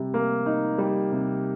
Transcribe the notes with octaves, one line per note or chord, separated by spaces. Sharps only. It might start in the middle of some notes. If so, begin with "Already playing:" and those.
Already playing: C3 G3
A#3
D#4
G3
C3